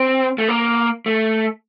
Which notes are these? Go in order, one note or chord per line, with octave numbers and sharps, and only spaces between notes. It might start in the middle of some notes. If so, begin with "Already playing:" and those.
Already playing: C4
A3
A#3
A3